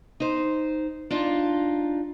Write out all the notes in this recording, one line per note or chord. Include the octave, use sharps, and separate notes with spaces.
D#4 C5
D4 D#4 F4